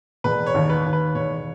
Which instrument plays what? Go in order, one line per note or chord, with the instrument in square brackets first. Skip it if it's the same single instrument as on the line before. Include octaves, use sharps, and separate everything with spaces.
[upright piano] E1 [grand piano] B4
[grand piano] C#5
[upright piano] D#2
[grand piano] B4
[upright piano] D#2
[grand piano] B4
[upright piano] E1 [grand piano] C#5